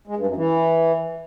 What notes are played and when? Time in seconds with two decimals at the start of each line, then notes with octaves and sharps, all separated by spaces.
0.08 G#3
0.17 G2
0.27 F#2
0.36 E3